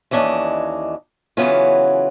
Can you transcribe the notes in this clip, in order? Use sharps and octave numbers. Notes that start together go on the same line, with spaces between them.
D#2 E3 C#4 D4 D#5
C#3 E3 F#3 B3 C#4 F4